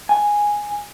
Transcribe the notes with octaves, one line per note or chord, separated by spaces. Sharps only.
G#5